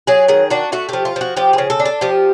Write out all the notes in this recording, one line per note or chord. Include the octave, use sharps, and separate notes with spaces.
F#3 G#4
D#3 G#4
D4 F#4
A3 F#4
F3 G4
F4
F3 F#4
F3 G4
C#3 G#4
A4
D4
A4
F3 G4